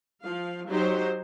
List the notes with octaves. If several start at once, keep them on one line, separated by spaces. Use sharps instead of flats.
F3 F5
F#3 D#4 G4 C5